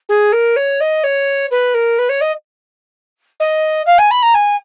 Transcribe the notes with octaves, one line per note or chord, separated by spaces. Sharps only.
G#4
A#4
C#5
D#5
C#5
B4
A#4
B4
C#5
D#5
D#5
F5
G#5
B5
A#5
G#5